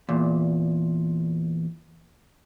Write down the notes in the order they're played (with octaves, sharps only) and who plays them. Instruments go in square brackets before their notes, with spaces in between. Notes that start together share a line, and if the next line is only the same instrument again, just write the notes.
[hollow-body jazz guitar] E2 A#2